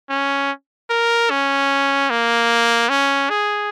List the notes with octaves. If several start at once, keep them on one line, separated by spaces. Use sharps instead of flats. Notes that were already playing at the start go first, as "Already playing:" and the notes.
C#4
A#4
C#4
A#3
C#4
G#4